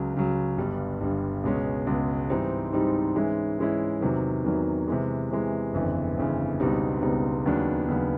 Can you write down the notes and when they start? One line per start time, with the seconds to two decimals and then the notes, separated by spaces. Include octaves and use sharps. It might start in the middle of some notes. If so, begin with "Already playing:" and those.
Already playing: C#2 C#3 F#3
0.14 C#2 C#3 F#3
0.58 G1 G2 D3 G3
1.00 G1 G2 D3 G3
1.43 C#2 B2 G#3 C#4
1.87 C#2 B2 G#3 C#4
2.30 G#2 E3 G3 C4 D#4
2.72 G#2 E3 G3 C4 D#4
3.16 G#2 E3 G#3 C#4 E4
3.59 G#2 E3 G#3 C#4 E4
4.01 E2 C3 D#3 F#3
4.44 E2 C3 D#3 F#3
4.88 C3 E3 G#3
5.30 C3 E3 G#3
5.73 G1 F2 C#3 E3
6.17 G1 F2 C#3 E3
6.60 C#2 B2 G3 C4 D#4
7.02 C#2 B2 G3 C4 D#4
7.46 D#2 C#3 F#3 B3 D4
7.88 D#2 C#3 F#3 B3 D4